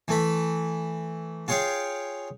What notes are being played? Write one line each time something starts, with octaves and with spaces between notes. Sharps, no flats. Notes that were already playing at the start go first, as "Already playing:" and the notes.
E3 A3 B5
F4 G#4 C#5 F5 G5